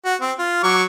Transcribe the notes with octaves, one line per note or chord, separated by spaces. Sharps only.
F#4
C4
F4
F#3 C#6 D6